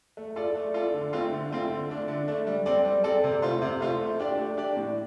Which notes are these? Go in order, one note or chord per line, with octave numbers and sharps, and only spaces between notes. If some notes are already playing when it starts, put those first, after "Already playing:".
A3
F4 A4 D5
A3
F4 A4 D5
D3
A3 C4 F4
D3
A3 C4 F4
D3
A3 D4
D3
A3 D4
G3
C4 A4 D5
G3
C4 A4 D5
C3
A3 F4 C5
C3
A3 F4 C5
A3
D4 G4 D5
A3
D4 G4 D5
A2